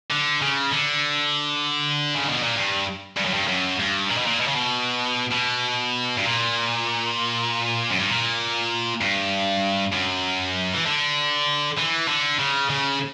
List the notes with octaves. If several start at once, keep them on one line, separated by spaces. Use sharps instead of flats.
D3
C#3
D3
C#3
B2
A#2
G2
G2
F#2
G2
F#2
G2
A#2
B2
A#2
B2
C#3
B2
B2
G2
A#2
F#2
G2
A#2
G2
F#2
E3
D3
E3
D3
C#3
C#3